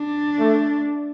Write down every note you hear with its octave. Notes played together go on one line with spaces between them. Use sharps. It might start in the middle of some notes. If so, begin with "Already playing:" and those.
Already playing: D4
A3